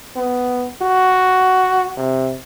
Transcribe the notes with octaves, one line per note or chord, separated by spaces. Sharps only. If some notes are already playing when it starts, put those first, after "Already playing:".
B3
F#4
C3